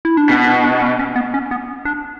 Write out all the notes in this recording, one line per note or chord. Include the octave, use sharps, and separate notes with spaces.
E4
D4
B2 C#4
D4
D4
C#4
C#4
B3
C#4
B3
D4